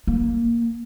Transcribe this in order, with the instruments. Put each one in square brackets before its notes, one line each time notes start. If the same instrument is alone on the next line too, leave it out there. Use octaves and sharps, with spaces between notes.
[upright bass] A#3